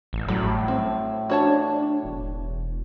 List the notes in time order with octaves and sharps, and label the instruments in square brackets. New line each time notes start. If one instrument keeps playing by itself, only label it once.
[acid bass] A1
[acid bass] A2 [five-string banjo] F#3 G3
[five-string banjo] C4
[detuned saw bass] D4 [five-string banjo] F#4 C#5 A5
[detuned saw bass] E1